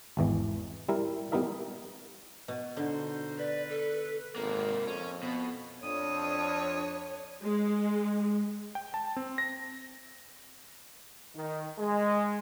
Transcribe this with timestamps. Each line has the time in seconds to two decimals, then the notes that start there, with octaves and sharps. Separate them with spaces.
0.17 G#1 E2 E3
0.89 G3 E4 A#4
1.32 G3 B3 D#4 E4 A#4 E5
2.48 B2
2.77 B2 D3 D#4 C5
3.38 B4 D5
3.68 A4
4.36 G#1 C3 A#3
4.87 F2 C#4
5.23 B2
5.83 F2 D4 C#5 D#6
7.43 G#3
8.75 G5
8.94 A5
9.16 C4
9.38 A#6
11.36 D#3
11.78 G#3